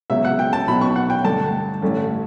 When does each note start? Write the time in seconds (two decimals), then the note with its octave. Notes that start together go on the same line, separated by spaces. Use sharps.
0.10 C#2 C#3 F#3 B3 E5
0.25 F#5
0.39 G5
0.53 A5
0.68 B1 B2 F#3 B3 B5
0.81 C#6
0.96 F#5
1.10 G5
1.24 G2 D3 A3 A5
1.82 A1 G2 D3 A3 C#4